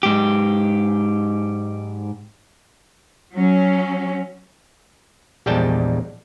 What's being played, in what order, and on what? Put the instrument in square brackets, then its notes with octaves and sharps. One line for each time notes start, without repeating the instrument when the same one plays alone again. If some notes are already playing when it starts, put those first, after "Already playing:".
[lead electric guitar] G#2 G4
[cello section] F#3 C#4
[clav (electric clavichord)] A#1 E2 G3 G#3 G5 A5